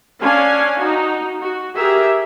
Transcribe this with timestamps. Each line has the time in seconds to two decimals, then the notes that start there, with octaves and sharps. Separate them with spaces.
0.22 C#4 D4 F5 G#5
0.79 D#4 F#4
1.41 F#4
1.77 G4 G#4 A#4 E5